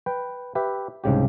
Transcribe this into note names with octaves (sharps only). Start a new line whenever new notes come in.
B4 G5
G4 B4 E5
C2 G#2 C#3 G4